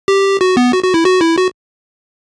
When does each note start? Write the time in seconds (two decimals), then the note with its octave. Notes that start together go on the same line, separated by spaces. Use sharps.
0.08 G4
0.41 F#4
0.57 B3
0.73 F#4
0.84 F#4
0.94 E4
1.05 F#4
1.21 E4
1.38 F#4